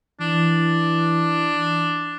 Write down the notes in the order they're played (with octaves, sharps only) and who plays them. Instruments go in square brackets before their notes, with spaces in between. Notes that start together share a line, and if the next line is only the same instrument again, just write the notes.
[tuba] E3 [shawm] D4